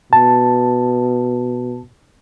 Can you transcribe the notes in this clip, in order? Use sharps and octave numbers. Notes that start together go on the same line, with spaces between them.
B2 A5